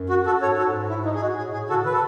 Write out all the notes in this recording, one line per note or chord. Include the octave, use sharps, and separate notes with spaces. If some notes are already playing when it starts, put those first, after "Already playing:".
Already playing: F#2
F#4
F#4 A4
G#2 A4 C#5
F#4 A4
E4
D#4
G#4
F#4
A2 G#4
A2 G#4
C#3 F#4 A4
D#3 B4
A4